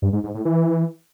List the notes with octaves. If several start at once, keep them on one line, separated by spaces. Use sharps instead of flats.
G2
G#2
G#2
A2
E3